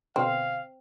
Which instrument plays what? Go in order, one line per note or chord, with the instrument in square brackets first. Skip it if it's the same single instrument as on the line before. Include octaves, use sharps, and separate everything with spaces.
[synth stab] B2 D3 [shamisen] C4 [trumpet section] F5